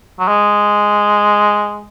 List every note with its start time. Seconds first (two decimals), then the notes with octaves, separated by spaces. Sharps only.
0.19 F#3
0.28 G#3